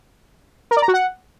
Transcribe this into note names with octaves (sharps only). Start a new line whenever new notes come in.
A#4
D5
A#5
F#4
F#5